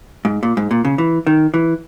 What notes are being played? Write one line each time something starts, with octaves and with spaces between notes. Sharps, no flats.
G#2
A#2
G#2
A#2
C#3
E3
D#3
E3